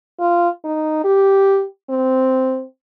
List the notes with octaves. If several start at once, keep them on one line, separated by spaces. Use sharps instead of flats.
F4
D#4
G4
C4